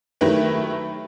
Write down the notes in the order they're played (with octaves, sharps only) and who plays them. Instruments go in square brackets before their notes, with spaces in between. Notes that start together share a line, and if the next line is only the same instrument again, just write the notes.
[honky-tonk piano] D#3 F#3 A3 E4 G4 B4